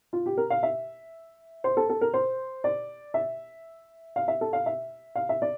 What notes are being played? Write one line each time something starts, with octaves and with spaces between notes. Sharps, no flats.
F4
G4
A#4
F5
E5
C5
A4
A4
A#4
C5
D5
E5
F5
E5
A4
F5
E5
F5
E5
D5